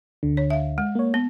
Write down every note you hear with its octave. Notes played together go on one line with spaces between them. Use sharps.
D2 D3
C#5
E5 F5
G#3
A#3 C#5
B3